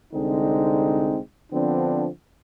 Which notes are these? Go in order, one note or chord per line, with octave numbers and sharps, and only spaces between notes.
C2 D3 G#3 C4 D#4
D3 F3 B3 C4 D4